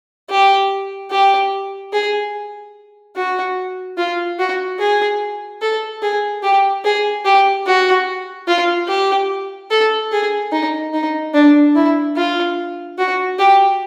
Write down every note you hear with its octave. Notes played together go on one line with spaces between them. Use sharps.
G4
G4
G#4
F#4
F4
F#4
G#4
A4
G#4
G4
G#4
G4
F#4
F4
G4
A4
G#4
D#4
D#4
D4
E4
F4
F#4
G4